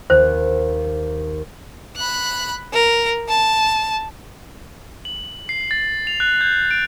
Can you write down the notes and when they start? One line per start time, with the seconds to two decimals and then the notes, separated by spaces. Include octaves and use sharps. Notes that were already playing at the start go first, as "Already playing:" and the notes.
0.10 D#2 C5
1.97 B5 F#6
2.73 A#4
3.29 A5
5.05 F#7
5.49 C7
5.71 A6
6.07 F7
6.20 F#6
6.41 G6
6.71 D7